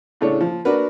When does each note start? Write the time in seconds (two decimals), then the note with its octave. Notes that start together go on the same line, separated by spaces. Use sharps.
0.21 A2 C#3 A3 D4 C#5
0.41 F3
0.65 D4 F#4 A#4 B4